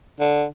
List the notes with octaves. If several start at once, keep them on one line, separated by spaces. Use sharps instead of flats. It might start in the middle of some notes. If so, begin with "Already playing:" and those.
D3